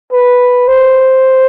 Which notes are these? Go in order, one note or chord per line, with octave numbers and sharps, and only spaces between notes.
B4
C5